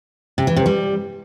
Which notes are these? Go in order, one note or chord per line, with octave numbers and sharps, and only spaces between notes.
C3
E3
C3
G3